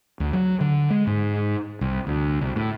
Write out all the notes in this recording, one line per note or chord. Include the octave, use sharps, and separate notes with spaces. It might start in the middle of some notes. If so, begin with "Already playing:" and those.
D2
F#3
D3
G#3
G#2
C2
D2
C2
A2